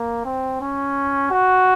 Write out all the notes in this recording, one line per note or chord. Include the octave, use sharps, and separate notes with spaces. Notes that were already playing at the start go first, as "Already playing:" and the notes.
Already playing: A#3
C4
C#4
F#4